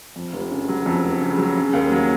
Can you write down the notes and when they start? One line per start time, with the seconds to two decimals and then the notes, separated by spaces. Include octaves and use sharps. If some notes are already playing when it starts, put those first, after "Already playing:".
0.16 F2
0.33 F1
0.51 C#3
0.69 F#3
0.86 F2
1.04 F1
1.21 C#3
1.38 F#3
1.57 C#3
1.73 D#2
1.92 F#3